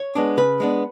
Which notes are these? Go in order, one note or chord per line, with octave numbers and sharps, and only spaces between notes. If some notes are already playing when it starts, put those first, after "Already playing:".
Already playing: C#5
G#3 B3 D4
C#3 B4
G#3 B3 D4